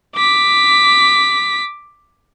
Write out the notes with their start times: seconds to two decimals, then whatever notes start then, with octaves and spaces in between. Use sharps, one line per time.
0.16 D6 B6